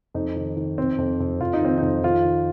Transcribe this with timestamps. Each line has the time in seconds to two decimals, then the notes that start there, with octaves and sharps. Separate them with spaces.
0.14 F2 D#4
0.36 D#3
0.57 D#3
0.78 F2 C4
0.98 F2
1.20 F2
1.41 F2 F4
1.53 D#4
1.62 D#3 C4
1.78 D#4
1.82 F2
2.04 D#3 F4
2.25 D#3